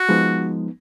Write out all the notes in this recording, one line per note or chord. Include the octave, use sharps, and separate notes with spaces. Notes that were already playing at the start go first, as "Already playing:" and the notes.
Already playing: F#4
F3 G#3 B3 D#4